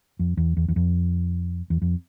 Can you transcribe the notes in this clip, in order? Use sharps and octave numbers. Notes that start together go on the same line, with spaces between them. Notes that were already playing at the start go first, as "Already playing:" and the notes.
F2
E2
E2
E2
F2
E2
F2